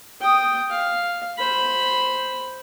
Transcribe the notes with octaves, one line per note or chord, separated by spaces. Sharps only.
G5 D#6
F5
C5 B5